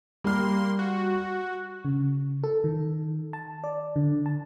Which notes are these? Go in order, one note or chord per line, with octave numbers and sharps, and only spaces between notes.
G3 A#3 C6 F6
F#4
C#3
A4
D#3
A5
D5
D3
A5